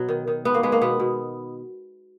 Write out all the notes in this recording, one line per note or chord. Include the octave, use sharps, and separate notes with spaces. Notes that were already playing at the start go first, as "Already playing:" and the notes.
Already playing: B2 F#3
D#3
D#3
G#3 B3
A#3
G#3 B3
A#3
B2 B3
B2